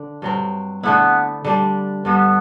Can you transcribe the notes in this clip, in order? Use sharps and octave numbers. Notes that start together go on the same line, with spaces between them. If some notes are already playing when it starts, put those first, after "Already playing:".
Already playing: D3 D4
G2 F#3 C4
D3 A3 B3 E4
D3 G3 D4
G2 D3 G3 B3